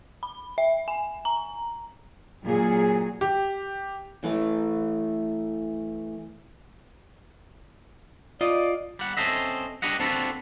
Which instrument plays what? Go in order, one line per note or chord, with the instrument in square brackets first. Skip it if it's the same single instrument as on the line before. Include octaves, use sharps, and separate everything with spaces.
[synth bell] B5
E5
G#5
A#5
[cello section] A#2 F#3 G#4
[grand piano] G4
[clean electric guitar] E3 A3
[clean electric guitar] F4 D#5 [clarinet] D5
[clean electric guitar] G3 F#5
C4 C#4 A4 C5 D#5 E5
D4 G4 B4 D#5 F#5
C4 D4 F4 F#4 A4 B4